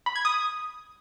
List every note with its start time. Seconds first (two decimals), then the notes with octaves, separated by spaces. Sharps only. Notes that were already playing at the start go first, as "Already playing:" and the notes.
0.06 B5
0.16 G#6
0.25 D#6